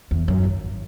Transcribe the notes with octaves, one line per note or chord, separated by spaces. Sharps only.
E2
F#2
G#1